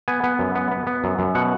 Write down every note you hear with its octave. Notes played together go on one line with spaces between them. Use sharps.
B3 G#5
B3
F#2
B3
B3
B3
F#2
F#2
B2 F#5